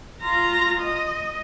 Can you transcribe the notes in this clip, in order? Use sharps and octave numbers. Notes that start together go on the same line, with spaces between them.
F4 A#5
D#5